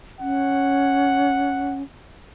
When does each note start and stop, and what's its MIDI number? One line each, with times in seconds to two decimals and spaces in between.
0.20 1.82 61
0.20 1.77 78